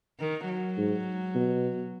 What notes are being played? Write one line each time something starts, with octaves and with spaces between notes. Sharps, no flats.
D#3
F#3
G#2
B2